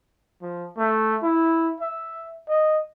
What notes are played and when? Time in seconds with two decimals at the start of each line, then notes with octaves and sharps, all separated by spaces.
0.42 F3
0.77 A3
1.22 E4
1.80 E5
2.48 D#5